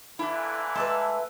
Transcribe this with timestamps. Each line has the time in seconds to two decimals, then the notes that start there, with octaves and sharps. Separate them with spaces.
0.19 A#2 D3 E3 A3 E4
0.75 G#3 A3 E4 B4 A5 E6